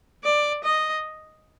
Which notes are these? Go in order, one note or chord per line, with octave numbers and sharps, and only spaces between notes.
D5
D#5